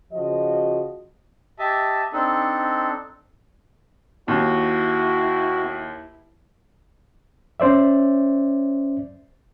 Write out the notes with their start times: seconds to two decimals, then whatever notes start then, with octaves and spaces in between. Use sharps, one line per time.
0.12 C#3 F3 F#4 D#5
1.59 G4 D#5 E5 A5
2.13 C4 D4 D#4 A4
4.28 D#2 E4 F#4
7.60 C#4 C5 D5 E5